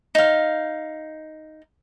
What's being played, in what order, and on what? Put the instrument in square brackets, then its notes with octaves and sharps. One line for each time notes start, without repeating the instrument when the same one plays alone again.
[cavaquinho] D#4 F5